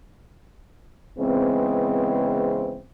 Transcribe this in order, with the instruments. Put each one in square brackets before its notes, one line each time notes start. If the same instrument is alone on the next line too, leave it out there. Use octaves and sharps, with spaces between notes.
[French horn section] C#3 E3 G#3 B3 C4